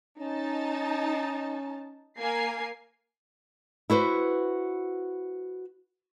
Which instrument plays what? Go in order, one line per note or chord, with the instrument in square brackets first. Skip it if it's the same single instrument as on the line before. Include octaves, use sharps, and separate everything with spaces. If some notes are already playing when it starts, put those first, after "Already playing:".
[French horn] C#4 [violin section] D#4 A5
[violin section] A#3 G#5 C7
[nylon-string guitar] E4 F#4 B4 C5